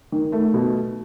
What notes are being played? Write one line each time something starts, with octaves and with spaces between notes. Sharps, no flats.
D#3
A3
B2